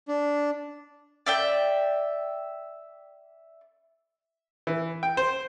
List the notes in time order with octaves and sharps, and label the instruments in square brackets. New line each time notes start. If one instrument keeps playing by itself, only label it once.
[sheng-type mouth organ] D4
[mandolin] D5 E5 G5
[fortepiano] E3
G5
C5